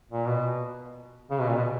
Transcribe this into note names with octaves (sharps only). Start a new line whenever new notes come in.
A#2
B2
C#3
B2
A#2
B2